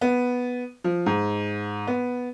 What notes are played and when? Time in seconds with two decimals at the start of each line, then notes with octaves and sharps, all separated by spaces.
0.01 B3
0.84 F3
1.06 G#2
1.87 B3